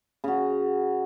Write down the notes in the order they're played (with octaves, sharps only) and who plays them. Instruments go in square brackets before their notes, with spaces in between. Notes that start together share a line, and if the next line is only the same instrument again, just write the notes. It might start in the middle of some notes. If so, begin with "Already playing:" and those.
[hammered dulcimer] C#3 F#4